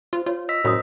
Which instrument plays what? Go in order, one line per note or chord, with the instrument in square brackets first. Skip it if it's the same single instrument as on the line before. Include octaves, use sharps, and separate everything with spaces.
[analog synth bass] F4 [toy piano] C5
[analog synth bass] F4 [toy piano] C#5
[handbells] D#5 E6 B6
[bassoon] F#2 [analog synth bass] A2 [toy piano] C5 C#5 D#6